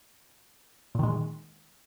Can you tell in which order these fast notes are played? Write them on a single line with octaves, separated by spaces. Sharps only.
A#2 D#3 G#3